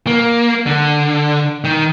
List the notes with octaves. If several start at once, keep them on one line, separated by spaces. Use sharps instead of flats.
A#3
D3
D#3